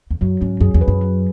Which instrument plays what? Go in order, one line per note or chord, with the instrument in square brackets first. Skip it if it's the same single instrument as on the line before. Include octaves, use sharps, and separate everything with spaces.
[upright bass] E2
[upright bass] F#2 [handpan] F#3
[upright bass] G#2 [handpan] C#4
[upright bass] F#2 [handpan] G#4
[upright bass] E2
[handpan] B4
[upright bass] F#2
[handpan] F#3